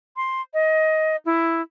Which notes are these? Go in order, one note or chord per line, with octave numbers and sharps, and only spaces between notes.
C6
D#5
E4